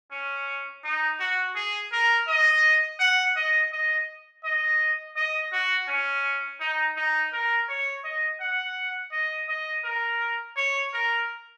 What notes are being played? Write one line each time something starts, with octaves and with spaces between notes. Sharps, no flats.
C#4
D#4
F#4
G#4
A#4
D#5
F#5
D#5
D#5
D#5
D#5
F#4
C#4
D#4
D#4
A#4
C#5
D#5
F#5
D#5
D#5
A#4
C#5
A#4